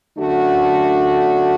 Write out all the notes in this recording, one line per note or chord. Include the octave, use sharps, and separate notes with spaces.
F#2 D3 A3 D4 F#4